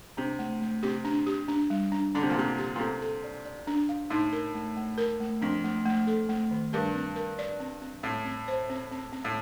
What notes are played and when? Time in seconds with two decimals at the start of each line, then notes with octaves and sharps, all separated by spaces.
0.17 C3 D4
0.39 A3
0.61 A3
0.83 C3 G4
1.05 D4
1.26 G4
1.48 D4
1.70 G3
1.92 D4
2.15 D3 D4
2.23 C3
2.30 A#2
2.36 C3 G4
2.58 G4
2.76 A#2
2.79 C3 A4
3.02 A4
3.24 D5
3.45 D5
3.67 D4
3.89 F5
4.10 A2 D#4
4.33 A#4
4.55 A3
4.77 A3
4.98 A#4
5.20 A3
5.41 F2 D4
5.64 A3
5.86 A3
6.07 A4
6.29 A3
6.51 D#3
6.73 G2 A#4
6.95 C4
7.16 A#4
7.39 D5
7.60 C4
7.82 C4
8.03 A2 C4
8.25 C4
8.48 C5
8.70 C4
8.91 C4
9.12 C4
9.25 A2